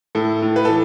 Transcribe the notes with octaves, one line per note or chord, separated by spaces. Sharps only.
A2 A4
A2
B4
A4
E3